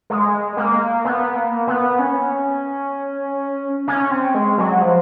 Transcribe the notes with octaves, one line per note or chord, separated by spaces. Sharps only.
G#3
A#3
B3
A#3
B3
C#4
C#4
C4
G#3
F#3
F3